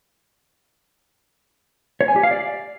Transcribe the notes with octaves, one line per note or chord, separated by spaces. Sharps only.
C#5
G#5
G4
F5
D5